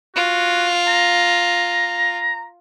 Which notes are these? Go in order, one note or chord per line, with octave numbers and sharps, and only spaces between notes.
F4 F#4
A#5